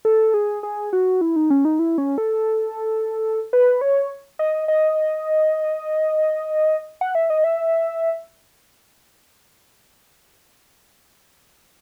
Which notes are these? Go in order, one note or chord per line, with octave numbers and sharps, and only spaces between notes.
A4
G#4
G#4
F#4
E4
D#4
C#4
D#4
E4
C#4
A4
B4
C#5
D#5
D#5
F#5
E5
D#5
E5